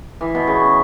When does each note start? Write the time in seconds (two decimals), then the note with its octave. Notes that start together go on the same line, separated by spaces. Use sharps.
0.21 E3
0.35 B2
0.47 C#3